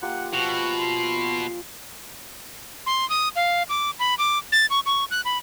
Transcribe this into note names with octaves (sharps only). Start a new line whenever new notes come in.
A#3 F4 G4 F#5
B2 F3 F#4
C6
C6
D#6
F5
D6
B5
D6
A6
C#6
C#6
F#6
B5